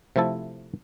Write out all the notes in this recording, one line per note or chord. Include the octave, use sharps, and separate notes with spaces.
C3 F3 A3 E4 A4